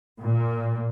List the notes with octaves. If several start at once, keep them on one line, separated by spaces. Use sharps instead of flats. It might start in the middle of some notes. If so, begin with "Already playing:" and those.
A#2